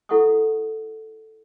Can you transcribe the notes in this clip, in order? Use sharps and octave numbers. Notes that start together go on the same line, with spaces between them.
E4 A4 F#5 C6 C#6 D#6